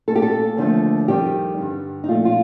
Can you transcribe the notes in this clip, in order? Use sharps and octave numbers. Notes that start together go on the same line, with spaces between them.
A#2 A3 A4
G4
A4
D#2 D3 F3 A3
F2 D#3 G3 G4
G2 D3 G3
D#4
A#2 F3 A3 F4
F4